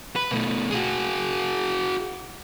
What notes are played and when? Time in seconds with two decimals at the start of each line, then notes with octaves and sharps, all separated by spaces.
0.16 B4
0.31 B2 A3
0.71 F#4 G#4